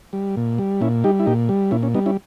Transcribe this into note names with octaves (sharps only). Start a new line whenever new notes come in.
G3
A#2
G3
A#2 C#4 E4
G3 D#4 G4
E4
A#2 D#4 G4
G3
A#2 C#4 E4
C#4
G3 B3 D#4
C#4 E4